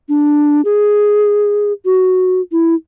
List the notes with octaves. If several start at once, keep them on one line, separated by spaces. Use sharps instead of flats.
D4
G#4
F#4
E4